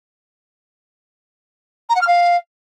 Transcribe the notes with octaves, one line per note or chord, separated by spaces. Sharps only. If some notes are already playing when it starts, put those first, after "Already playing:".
A#5
F#5
F6
F5